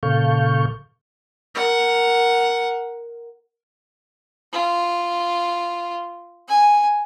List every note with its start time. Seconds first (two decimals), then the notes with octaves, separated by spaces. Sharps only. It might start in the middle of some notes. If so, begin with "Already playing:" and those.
0.03 A#2 C#3 A4 F5 C#6 G6
1.55 A#4 F#5
4.53 F4
6.49 G#5